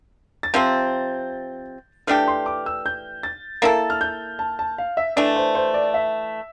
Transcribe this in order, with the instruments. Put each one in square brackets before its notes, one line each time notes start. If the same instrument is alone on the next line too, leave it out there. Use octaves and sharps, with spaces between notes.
[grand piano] A6
[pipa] C3 F3 C4 [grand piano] G6
[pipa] E3 A3 D4 G4 [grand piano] F6
[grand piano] C6
D6
E6
G6
A6
[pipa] A#3 E4 A4 [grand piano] A6
[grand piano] F6
G6
A5
A5
F5
E5
[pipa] E3 A3 D4 [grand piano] D5
[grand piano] C5
C5
D5
E5